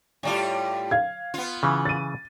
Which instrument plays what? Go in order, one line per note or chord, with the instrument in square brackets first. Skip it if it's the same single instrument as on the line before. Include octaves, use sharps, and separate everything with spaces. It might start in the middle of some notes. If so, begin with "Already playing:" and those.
[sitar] A2 G3 F4
[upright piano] F5 G#6
[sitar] B3 F4
[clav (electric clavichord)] C#3 E3
[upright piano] A6 D#7